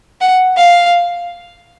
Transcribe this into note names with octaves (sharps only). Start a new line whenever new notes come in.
F#5
F5